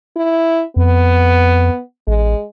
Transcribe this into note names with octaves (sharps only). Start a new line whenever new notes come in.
E4
F2 B3
A1 G#3